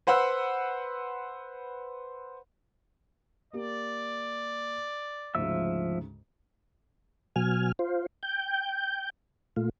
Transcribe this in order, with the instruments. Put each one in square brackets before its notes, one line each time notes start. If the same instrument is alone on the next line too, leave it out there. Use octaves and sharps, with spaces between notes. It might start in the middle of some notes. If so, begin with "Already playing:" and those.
[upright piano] B4 C5 F#5 B5 E6 F#6
[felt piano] A#3 G4 A#4 [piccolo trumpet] D5
[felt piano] D2 G#2 C#3 [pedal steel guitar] F3 E5 E6
[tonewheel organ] B2 F#3 G#5 F6
F4 C5
G5 G6
A#2 A3 F4